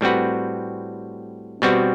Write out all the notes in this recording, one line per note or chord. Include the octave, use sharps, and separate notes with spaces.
A2 G3 C4 F#4 B4
B2 G3 C4 F#4